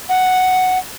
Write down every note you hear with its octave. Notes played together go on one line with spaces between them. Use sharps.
F#5